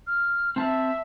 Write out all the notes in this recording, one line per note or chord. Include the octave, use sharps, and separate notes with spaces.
F6
C4 E5 A5